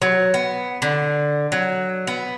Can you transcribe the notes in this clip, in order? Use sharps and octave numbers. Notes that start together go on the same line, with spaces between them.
F#3
B3
D3
F#3
B3